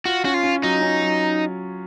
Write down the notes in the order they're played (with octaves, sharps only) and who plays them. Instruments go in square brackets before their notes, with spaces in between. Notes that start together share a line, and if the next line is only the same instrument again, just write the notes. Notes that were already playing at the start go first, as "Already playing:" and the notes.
[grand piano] F4 [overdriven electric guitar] F#4
[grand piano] C#4 [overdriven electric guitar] F#4
[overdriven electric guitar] F4
[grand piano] C#4
[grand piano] F#3 [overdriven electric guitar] D#4
[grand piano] C#4
F#3